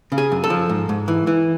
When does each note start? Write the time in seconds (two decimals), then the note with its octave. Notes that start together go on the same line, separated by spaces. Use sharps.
0.12 C#3
0.18 G#4
0.32 F#2
0.44 A4
0.50 F3
0.69 G#2
0.89 G#2
1.08 E3
1.27 E3